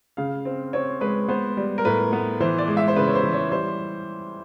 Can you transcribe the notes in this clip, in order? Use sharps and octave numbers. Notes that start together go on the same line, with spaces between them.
C#3 F5
C4
C4 C#5
G#3 B4
B3 C5
G3
A#4
A2 B4
B3
E3 C5
D5
G#3
E5
C5
C#3 B4
C#5
C5
E3
C#5
G3 C5